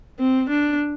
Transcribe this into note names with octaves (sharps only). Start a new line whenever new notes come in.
C4
D4